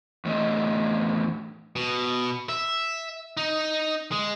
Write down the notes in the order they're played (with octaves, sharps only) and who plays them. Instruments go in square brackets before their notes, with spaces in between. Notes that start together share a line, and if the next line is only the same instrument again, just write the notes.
[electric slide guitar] E2 A2 A3 D4 D#5
[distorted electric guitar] B2
E5
D#4
G#3